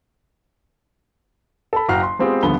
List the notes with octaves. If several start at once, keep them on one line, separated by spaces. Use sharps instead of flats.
A4 B5
F#1 F#4 G5 A#5 F6 C7
C6
G#3 B3 C4 F4 G4 G#4
D#1 D3 F3 B3 G7